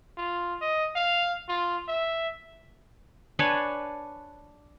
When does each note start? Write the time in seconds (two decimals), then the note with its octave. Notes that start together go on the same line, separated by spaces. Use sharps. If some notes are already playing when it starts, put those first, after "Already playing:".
0.17 F4
0.61 D#5
0.96 F5
1.49 F4
1.88 E5
3.39 D4 B4 C#5 G#5